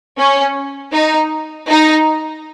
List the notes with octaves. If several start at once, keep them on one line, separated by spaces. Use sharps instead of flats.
C#4
D#4
D#4